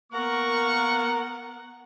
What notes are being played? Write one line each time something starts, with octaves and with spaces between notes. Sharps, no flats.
A#3 B3 A#4 F#5 C#6